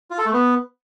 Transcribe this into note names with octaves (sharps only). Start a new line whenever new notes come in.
F4
A4
A3
B3